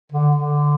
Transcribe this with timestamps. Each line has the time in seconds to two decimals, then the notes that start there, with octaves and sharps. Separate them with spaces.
0.12 D3
0.35 D3